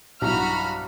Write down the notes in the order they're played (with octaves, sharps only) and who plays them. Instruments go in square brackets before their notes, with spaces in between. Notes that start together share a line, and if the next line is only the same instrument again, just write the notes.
[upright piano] B1 G2 E4 [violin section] F#4 B5 F6 [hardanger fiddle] A#5